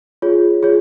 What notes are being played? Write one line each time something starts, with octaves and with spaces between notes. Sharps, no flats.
F4 G#4 C#5
F4 G#4 C#5